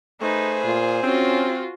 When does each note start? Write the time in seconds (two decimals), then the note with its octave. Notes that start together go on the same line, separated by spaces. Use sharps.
0.21 A3 D#4 G#4 B4 C5
0.64 A#2 F4
1.04 C4 C#4 F4 F#4